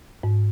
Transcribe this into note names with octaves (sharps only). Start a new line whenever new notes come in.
G#2